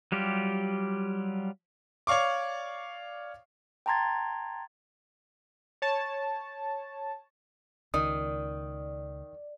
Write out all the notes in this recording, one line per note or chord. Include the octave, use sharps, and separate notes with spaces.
F#3 G3 F4 G4
C#5 D5 F5 C#6 D6
G5 A5 A#5 C6 G#6 A6
C#5 A5
C#2 D#3 D5 D#6